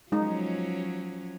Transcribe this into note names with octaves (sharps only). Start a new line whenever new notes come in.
F3 F#3 G#3 C#4 D#4